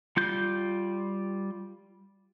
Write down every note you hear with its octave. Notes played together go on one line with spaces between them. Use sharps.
G3 F4 G6